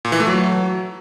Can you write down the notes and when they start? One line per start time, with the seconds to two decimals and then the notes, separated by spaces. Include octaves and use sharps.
0.05 A#2
0.12 E3
0.20 A3
0.27 F#3